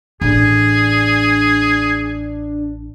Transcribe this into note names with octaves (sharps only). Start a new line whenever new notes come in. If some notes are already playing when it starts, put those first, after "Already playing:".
A1 D4 G#4